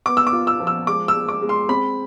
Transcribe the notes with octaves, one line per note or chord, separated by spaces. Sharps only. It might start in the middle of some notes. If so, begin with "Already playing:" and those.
B3 D6
E6
D6
F4
E6
F3
E6
G#3 D6
E6
G#3
D6
G#3
C6
C4 B5